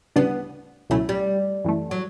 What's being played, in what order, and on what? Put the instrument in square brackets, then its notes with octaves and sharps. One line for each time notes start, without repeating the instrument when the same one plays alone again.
[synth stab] D2 C#3 E3 G3 D4 [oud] B3
[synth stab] C#2 B2 F#3 C#4 E4 [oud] A3
[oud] G3
[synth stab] F#2 E3 A3
[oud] F#3